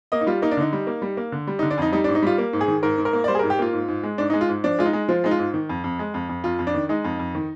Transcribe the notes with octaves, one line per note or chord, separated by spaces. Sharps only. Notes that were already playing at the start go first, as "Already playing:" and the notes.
A#3 D#5
D#4
G3 F4
A#3 D#4
D4
D3 D#4
G3
A#3
G3
A#3
D3
G3
D#4
D3
D4
F2 D#4
G3 D#4
D4
G#2
D#4
G3 F4
A#3
G#2
G#4
D#3
G#2 A#4
G#2
A#4
A#3
D5
G3 C5
G#4
A#4
G#2
G4
A#3 F4
G#2
G#2
G#3
G#2 D4
D#4
G#3
F4
G#2
F3 D4
G#3 F4
D#4
G#3
F3 F4
G#3 D#4
F4
G#2
D#3
F2
F2
G#3
F2
F2
F2 F4
F2
D4
D#3
G#3 D#4
F2
F2
D#3